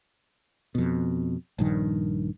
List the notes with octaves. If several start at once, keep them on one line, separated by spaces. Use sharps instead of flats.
F2 B2
A#1 G2 D#3